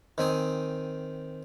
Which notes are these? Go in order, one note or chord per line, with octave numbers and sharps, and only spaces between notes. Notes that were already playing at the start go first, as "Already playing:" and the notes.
D#3 C4 G#5 D#6